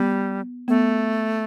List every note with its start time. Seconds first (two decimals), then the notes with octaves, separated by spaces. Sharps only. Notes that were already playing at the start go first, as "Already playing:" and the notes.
Already playing: G3 B3
0.68 A3 B3